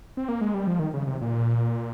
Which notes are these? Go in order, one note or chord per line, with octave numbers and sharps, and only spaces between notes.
C4
A#3
G#3
G3
F3
D#3
C#3
C3
A#2